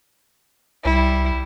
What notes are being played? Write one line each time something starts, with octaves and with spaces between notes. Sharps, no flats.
C2 G3 E4